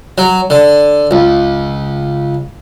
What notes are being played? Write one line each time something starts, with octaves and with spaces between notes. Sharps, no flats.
F#3
D3
C#2